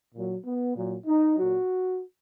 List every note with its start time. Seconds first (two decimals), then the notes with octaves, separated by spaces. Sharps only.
0.14 A#2 F#3
0.44 B3
0.75 A#2 F#3
1.06 D#4
1.36 A#2 F#3 F#4